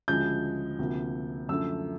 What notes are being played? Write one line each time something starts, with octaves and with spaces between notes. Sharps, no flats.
D2 C#3 F3 G#3 G6
D2 C3 F3 A#3
F#2 D3 F3 A3 E6